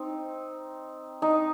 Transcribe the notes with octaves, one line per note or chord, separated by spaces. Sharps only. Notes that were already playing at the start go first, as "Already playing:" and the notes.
Already playing: C4 D#4
D#4